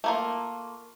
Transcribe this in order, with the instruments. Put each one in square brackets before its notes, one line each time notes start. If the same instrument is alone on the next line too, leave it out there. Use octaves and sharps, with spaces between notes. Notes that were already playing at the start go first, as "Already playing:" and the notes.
[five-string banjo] A3 A#3 F4